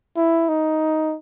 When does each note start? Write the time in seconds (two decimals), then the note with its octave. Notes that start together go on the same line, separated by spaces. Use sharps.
0.16 E4
0.49 D#4